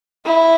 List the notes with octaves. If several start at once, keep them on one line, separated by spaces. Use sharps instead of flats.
E4